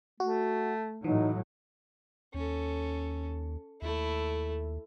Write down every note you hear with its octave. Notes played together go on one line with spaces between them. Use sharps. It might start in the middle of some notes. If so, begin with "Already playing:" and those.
A3 F#4
A2 E3 F#3 D#4
D#2 C#4 A4
D#2 A3 E4